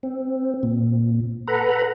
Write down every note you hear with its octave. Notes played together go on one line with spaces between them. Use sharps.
C4
A#2
A4 B4 F#5 A#5 B5